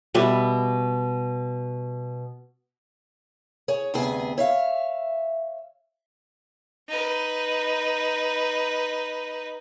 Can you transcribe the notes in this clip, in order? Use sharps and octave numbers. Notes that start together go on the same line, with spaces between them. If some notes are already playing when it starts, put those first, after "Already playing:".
B2 G3 B4 E5
G#4 C#5
D2 G2 C3 B3 G#4 G#5
C#5 E5 F5
D#4 B4